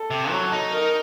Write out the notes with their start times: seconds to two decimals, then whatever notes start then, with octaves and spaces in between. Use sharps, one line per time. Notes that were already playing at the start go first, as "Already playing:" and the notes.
Already playing: A4
0.10 C3
0.31 F#3
0.52 D#4
0.72 A#4